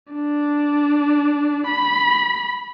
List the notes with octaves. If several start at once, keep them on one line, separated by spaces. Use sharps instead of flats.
D4
B5